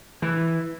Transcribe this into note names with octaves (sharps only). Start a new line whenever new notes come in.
E3